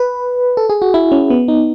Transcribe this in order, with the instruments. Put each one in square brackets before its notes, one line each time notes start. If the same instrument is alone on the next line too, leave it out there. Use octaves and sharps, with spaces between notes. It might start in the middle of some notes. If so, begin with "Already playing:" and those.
Already playing: [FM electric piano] B4
A4
G#4
F#4
E4
C#4
B3
D#4